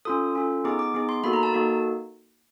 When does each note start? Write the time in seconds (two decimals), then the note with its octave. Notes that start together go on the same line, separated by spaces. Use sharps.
0.05 C#4 F4 A4 D#6
0.35 C#4 F4 A4
0.64 B3 D#4 G#4 D6
0.79 D6
0.94 B3 D#4 G#4
1.09 C6
1.24 A#3 D#4 F#4 A4 B5
1.33 A#5
1.43 A5
1.53 A#3 D#4 F#4 A4